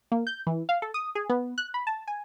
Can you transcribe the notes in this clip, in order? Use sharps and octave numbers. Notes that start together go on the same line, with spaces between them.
A#3
G6
E3
F5
A4
D#6
G#4
B3
F#6
B5
A5
G#5